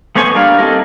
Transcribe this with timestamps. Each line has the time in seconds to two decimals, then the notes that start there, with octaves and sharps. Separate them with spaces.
0.16 A3 B3 C5 C#5 G#5
0.35 G3 A#3 D4 F5
0.58 C4 D#4 E4 A4 A#4